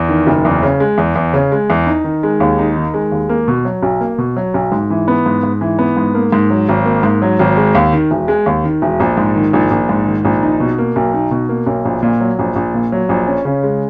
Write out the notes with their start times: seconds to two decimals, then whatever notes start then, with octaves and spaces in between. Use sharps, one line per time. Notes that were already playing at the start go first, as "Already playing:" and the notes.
Already playing: E2
0.09 D#3
0.27 F#1
0.45 E2
0.62 C#3
0.80 G#3
0.98 E2
1.16 E2
1.33 C#3
1.52 G#3
1.70 E2
1.87 D#4
2.04 D#3
2.23 G#3
2.40 D#2
2.59 D#4
2.76 D#3
2.94 G#3
3.12 D#2
3.29 A#3
3.48 B2
3.65 F#3
3.83 B1
4.01 A#3
4.18 B2
4.36 F#3
4.54 B1
4.72 G#2
4.90 E3
5.08 B3
5.26 G#2
5.43 G#2
5.61 E3
5.79 B3
5.97 G#2
6.14 A#3
6.32 G#2
6.50 F#3
6.69 G#1
6.85 A#3
7.03 G#2
7.22 F#3
7.39 G#1
7.57 G#3
7.75 D#2
7.93 D#3
8.11 E1
8.28 G#3
8.46 D#2
8.64 D#3
8.82 E1
9.00 A#1
9.17 G#2
9.36 D#3
9.53 A#1
9.71 A#1
9.89 G#2
10.06 D#3
10.25 A#1
10.43 D#4
10.60 B2
10.78 A#3
10.96 B1
11.14 D#4
11.31 B2
11.49 A#3
11.67 B1
11.85 A#1
12.03 A#2
12.20 F#3
12.39 A#1
12.56 A#1
12.74 A#2
12.92 F#3
13.09 A#1
13.27 C#4
13.45 C#3
13.63 G#3